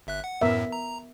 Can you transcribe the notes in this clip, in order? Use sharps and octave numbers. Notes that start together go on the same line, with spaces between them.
G1 E5 F#6
F#5
F#2 A2 B3 A#4 E5
A#5